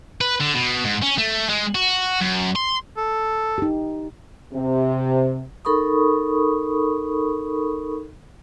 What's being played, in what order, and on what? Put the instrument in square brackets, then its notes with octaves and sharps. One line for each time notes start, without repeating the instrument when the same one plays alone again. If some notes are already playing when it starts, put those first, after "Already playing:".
[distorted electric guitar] B4
D3
B2
G#2
C#4
A3
G#3
F#4
F#2
C6
[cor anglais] A4
[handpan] D#4 G4
[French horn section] C3
[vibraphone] D#4 A4 A#4 B5 C#6 D#6